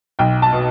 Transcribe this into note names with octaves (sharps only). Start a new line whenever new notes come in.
B1 G5
A5
B2